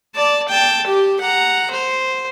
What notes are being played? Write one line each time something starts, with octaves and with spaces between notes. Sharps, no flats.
D5 A5
G5 A5
G4
F#5 A#5
C5